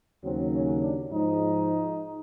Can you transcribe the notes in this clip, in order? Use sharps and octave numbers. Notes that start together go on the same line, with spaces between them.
D#2 C#3 F#3 C4
C#4
D4
G#2 F3 G#3 D#4